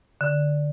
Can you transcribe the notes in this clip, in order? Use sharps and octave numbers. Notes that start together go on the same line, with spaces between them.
D3